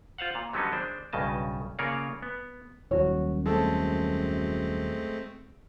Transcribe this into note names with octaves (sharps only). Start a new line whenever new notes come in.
F4 C5 F5 F#5
A#2
D3 F#3 G3 B3 C#4 D#4
G#3 D4 C5
B1 G2 C#3 D#5 A5
C#3 A#3 F4 A#4 C#5 D5
B3
D#1 F#2 F#4 C#5
G#3 A3 C4 A4